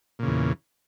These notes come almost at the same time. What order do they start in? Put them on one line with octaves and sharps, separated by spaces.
A#2 C#3 E2